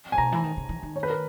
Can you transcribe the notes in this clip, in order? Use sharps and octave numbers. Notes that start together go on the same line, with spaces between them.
G#5
B2 A#5
E3
D#3
C#3
E3
D#3
C#5
B4
A#4